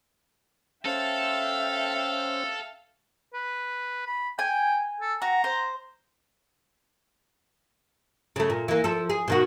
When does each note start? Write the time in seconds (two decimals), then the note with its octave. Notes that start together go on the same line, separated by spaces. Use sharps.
0.85 C#4 A4 C5 E5 F5 G5
3.33 B4
4.07 B5
4.39 G5 G#5
5.01 A4
5.22 F#4 A#5
5.44 C5
8.36 C#3 A3
8.50 A#2
8.68 E3 A#3
8.84 F3 A4
9.10 G#4
9.28 B2 D#3 F#4